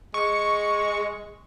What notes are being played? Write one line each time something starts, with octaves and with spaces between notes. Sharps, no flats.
G#3 C#6